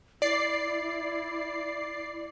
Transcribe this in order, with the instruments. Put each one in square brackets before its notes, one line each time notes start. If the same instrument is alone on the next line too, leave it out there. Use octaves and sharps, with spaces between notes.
[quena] E4 [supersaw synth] D5 C7